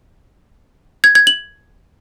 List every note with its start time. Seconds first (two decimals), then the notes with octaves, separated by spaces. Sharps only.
1.04 G#6
1.15 G#6
1.27 F#7